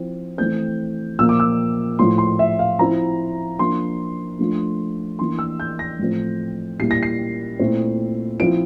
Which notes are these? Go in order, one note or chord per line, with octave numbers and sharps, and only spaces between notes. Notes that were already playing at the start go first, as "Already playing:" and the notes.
Already playing: F3 C4 E4
E3 A3 C4 G6
A#2 F3 A#3 E6
D6
E6
A2 F3 A3 E4 C6
C6
E5
F5
F3 C4 E4 A#5
F3 A#3 D4 C6
F3 A3 D4
E3 A#3 D4 C6
E6
G6
A#6
A2 F3 A3 C4
A#2 G3 A#3 E4 C7
A#6
C7
A#2 A3 C4 E4
F3 C4 E4 D7